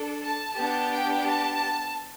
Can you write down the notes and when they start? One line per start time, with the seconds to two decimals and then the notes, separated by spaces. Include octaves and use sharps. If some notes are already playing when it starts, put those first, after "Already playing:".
Already playing: D4 A4
0.23 A5
0.57 B3 D4 G4 A5
0.91 G5
1.26 A5